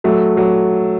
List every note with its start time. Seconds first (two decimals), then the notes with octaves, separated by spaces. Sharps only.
0.04 F#3 A3
0.37 F#3